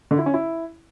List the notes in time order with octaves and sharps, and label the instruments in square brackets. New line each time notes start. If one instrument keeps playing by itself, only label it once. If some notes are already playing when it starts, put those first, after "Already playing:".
[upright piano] D3
E4
C#4
E4